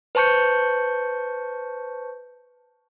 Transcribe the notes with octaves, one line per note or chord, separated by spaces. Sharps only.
B4 C5 A5 C#6 G6 C#7